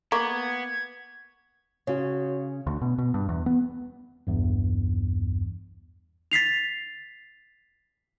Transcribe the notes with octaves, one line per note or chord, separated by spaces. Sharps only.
A#3 B3 C#6 G#6
C#3 F#4 C#5
D2
B2
B2
G2
E2
B3
B1 E2 G2
A6 B6 C7 F7